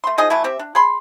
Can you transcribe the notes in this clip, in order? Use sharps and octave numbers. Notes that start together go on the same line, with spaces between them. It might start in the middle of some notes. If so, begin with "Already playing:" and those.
A3 C6
F3 D#4 G#4 D#5
E3 F#3 A3 E4
C4 G4 E5
D4
G#4 B5 C6